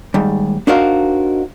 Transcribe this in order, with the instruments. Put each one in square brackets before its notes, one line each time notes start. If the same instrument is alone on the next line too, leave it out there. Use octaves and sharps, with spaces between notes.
[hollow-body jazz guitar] D#2 G#2 G3
D4 D#4 F#4 A#4 C5 F5